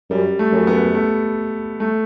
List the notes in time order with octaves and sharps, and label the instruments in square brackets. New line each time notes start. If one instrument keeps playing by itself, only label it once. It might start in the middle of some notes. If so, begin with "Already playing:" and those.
[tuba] F#2 [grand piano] G3
[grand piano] A3
[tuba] F#2
[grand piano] B3
A3
A3